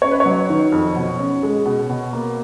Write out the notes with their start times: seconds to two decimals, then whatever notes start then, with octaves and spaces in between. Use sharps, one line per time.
0.02 C#4 C#5
0.11 B4
0.20 C#5
0.26 F#3
0.50 D#3
0.72 F2
0.96 B2
1.19 C#4
1.43 G#3
1.66 B2
1.90 B2
2.13 A#3